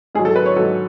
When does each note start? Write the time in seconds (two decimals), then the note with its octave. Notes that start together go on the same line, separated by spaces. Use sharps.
0.15 G#2 G#4
0.19 F#3
0.25 A4
0.36 B4
0.46 C#5
0.56 F#3 A4
0.60 G#2